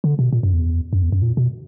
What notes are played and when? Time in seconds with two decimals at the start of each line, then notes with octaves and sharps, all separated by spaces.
0.04 D3
0.19 B2
0.33 A#2
0.43 F#2
0.53 E2
0.93 F#2
1.03 E2
1.12 F#2
1.22 A#2
1.37 B2